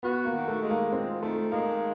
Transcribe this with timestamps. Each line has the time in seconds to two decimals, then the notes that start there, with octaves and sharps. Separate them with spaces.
0.03 B3 F#4
0.25 A#3
0.33 D#3
0.48 A3
0.63 G#3
0.70 A#3
0.92 C4 F4
1.22 D#3 A3
1.52 G#3 A#3